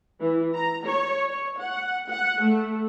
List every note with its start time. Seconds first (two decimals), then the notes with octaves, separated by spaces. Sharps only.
0.20 E3
0.54 A#5
0.85 C#5
1.29 C#5
1.60 F#5
2.09 F#5
2.42 A3